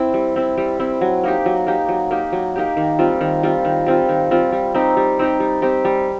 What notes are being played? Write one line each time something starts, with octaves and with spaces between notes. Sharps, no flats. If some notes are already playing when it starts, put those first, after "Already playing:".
Already playing: C4 E4
G3
C4 E4
G3
C4 E4
F#3
A#3 D#4 G4
F#3
A#3 D#4 G4
F#3
A#3 D#4 G4
F#3
A#3 D#4 G4
D#3
G3 C4 F4
D#3
G3 C4 F4
D#3
G3 C4 F4
D#3
G3 C4 F4
G3
C4 D#4 G4
G3
C4 D#4 G4
G3
C4 D#4 G4
G3